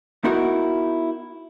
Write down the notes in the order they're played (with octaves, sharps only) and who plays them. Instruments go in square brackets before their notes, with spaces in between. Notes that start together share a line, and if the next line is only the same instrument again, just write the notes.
[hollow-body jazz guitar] B3 D#4 E4 F#4 A#4